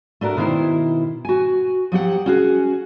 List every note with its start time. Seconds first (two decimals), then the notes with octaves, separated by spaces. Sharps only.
0.21 A3 D4 F#4 A#4
0.37 B2 D#3 E4 C5
1.25 F#4 G#5
1.92 F3 F#3 G4 F#5
2.26 C#4 F#4 G#4